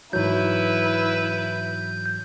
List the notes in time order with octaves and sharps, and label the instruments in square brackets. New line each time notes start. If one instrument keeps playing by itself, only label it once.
[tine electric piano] G#2 E3 F#3 [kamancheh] E4 B4 [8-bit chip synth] G6